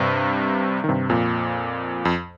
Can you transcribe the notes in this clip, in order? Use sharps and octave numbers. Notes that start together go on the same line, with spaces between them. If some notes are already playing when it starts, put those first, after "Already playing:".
Already playing: G2 C3
D#3
G2 C3
F2 A#2
F2